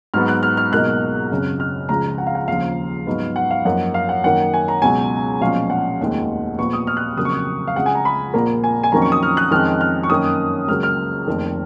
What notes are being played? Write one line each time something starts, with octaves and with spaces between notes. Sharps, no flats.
G#2 F#3 B3 F6
F#6
F6
F6
C#2 B2 F#3 A#3 D#4 F#6
G#1 F#2 C#3
F6
C#2 C#3 F3 A#5
F#5
F5
F#5
D#2 C#3 F3 F5
G#2 F#3 B3 D#4
F#5
F5
F#2 F3 A#3 D#4 F#5
F5
F#5
F#2 D#3 A#3 F#5
G#5
A#5
C#2 B2 F#3 C#4 G#5
B1 A#2 F3 G#3 C#4 F5
F#5
F1 D#2 D#3 G#3
A#1 A#2 F3 B3 C#6
D#6
F6
F#6
F2 C#3 F#3 A#3 D#6
C#6
D#6
F5
C#2 C#3 G#3 F#5
G#5
A#5
B5
A#1 A#2 F3 A#3 A#5
G#5
G#5
F2 D#3 F#3 A#3 C#4 A#5
C#6
D#6
F6
F#6
F2 D#3 G#3 C#4 F6
F6
C#6
F#2 D#3 A#3 C#4 D#6
C#2 C#3 F#3 A#3 F6
F6
F1 F2 D#3 A#3 D#4